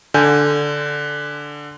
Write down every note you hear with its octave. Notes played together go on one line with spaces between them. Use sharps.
D3 G#5 G6